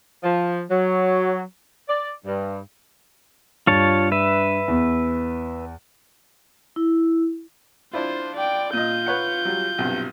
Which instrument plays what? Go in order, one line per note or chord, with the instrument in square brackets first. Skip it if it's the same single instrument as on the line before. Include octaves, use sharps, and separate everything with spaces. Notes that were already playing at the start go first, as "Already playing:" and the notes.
[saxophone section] F3
F#3
D5
G2
[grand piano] G2 [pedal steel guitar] F4 C#5 A5
[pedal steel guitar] B4 E5
[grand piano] E2
[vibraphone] E4
[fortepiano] D4 E4 F4 [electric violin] C5
[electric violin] D5 G5
[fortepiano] A#2 D#5 [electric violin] F4 G6
[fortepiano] B4 C#5 F#5
F#3 G3
B1 G2 C3